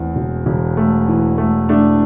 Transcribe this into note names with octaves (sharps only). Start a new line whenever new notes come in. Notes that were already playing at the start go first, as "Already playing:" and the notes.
Already playing: E2 E3 A3 C4
E1
E1
A3
E3
A3
A3 D4